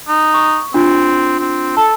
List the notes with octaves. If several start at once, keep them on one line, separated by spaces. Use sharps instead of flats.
D#4
C#6
C4 D4 F4
C4
A4 A5